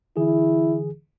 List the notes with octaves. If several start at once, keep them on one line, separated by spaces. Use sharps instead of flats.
D3 E3 E4 G#4